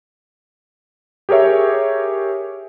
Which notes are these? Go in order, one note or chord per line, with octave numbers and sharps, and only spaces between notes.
G4 G#4 A#4 C#5 E5